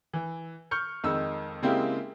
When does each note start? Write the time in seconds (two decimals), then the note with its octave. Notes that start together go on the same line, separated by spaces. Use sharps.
0.14 E3
0.71 C#6 F6 G6 C#7
1.04 F2 D#3 G#3 D#4 E6
1.63 C#3 G#3 A#3 C4 E4 G4